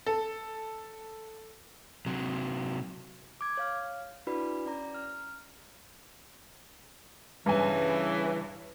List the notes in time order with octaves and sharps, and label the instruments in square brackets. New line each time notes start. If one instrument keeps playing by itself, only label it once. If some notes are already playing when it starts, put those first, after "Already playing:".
[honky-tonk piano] A4
[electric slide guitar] C3 F#3
[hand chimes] D6 G#6
C#5 F5 F6
D4 E4 F#4 B4 D5 B5
C#4 D5 A#5
F6
[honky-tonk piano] G2 G#5 [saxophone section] C#3 E3